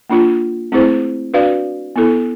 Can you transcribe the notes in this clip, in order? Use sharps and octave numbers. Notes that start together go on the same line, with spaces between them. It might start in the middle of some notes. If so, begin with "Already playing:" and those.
A#3 D4 F4
A3 C4 E4 G#4 C5
D4 F#4 B4 D5 F5
B3 E4 A4